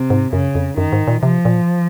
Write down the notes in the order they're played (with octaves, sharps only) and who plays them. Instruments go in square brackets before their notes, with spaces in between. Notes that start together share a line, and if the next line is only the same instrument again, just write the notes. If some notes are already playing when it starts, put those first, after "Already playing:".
Already playing: [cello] C3
[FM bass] G#2
[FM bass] F#2 [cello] C#3
[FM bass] F2
[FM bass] F#2 [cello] D#3
[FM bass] G#2
A#2
[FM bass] C3 [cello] F3
[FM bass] A#2